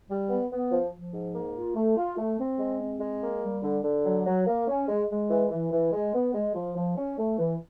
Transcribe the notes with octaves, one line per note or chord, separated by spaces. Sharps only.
G3
B3
B3
F3
F3
G#2
A#3
F4
A3
F4
A3
C4
G#3
C4
G#3
A#3
G3
D3
D3
F#3
F#3
A#3
C#4
G#3
G#3
E3
E3
E3
G#3
B3
G#3
F3
F3
C#4
A3
E3